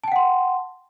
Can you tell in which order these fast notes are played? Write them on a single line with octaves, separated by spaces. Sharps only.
A5 G5 F#5 C6